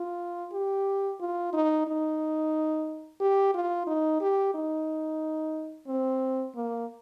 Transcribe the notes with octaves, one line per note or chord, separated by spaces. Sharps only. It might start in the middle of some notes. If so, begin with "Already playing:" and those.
Already playing: F4
G4
F4
D#4
D#4
G4
F4
D#4
G4
D#4
C4
A#3